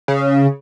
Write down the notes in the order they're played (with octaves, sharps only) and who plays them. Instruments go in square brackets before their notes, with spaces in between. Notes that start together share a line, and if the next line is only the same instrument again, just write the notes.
[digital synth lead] C#3